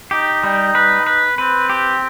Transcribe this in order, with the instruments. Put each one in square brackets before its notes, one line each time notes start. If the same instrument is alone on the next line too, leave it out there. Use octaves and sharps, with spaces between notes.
[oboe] D#4 [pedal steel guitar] G4
[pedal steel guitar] G3
B4
B4
[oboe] C4 [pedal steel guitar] B4
[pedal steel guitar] G4